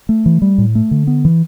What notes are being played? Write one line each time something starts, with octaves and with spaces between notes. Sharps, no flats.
A3
E3
G3
A2
A3
D3
B3
E3